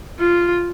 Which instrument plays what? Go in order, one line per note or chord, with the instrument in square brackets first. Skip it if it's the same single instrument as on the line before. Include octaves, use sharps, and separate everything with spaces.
[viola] F4